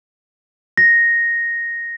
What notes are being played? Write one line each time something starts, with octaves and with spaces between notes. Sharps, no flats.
A#6